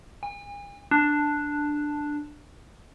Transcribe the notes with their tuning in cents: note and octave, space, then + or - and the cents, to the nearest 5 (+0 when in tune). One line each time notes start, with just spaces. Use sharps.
G#5 -45
D4 +5